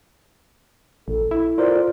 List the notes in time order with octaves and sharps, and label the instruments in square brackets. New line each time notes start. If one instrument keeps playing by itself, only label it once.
[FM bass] A#1 [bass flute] A4
[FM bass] E4
[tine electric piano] F4 A#4 C5 [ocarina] D5